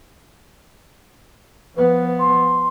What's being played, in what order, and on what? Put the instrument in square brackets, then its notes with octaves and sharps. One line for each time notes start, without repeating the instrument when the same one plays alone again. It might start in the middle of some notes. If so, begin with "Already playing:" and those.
[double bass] F3 B3 [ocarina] B4
[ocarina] C6